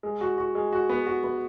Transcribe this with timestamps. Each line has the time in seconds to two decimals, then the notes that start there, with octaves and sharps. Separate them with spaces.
0.03 G#3
0.21 F#4
0.38 F#4
0.55 G#3
0.73 F#4
0.89 B3
1.07 F#4
1.24 B3